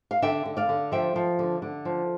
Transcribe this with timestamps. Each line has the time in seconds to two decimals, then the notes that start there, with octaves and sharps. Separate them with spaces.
0.11 F5
0.22 D3 E5 G5
0.45 D3
0.57 D5 F5
0.69 D3
0.92 F3 E5 G5
1.16 F3
1.39 D3
1.62 D3
1.85 F3